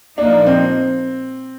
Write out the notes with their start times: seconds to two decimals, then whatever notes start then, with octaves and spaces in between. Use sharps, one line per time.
0.17 A#2 F3 A#3 D4 D#4
0.47 C4